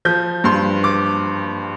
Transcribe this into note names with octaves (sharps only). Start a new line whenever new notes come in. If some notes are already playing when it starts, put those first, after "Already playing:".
F3 G6
G2 C6
D6